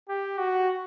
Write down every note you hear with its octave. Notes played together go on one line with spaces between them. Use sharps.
G4
F#4